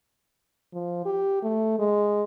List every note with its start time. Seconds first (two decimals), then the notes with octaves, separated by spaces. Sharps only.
0.74 F3
1.05 G4
1.43 A3
1.79 G#3